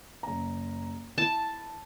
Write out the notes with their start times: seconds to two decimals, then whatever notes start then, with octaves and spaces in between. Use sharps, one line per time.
0.23 F#1 A#5
1.18 E4 A5